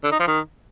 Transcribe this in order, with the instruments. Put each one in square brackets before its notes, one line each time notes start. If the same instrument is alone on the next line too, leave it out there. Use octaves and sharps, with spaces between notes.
[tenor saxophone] D3
D#4
F3
D#3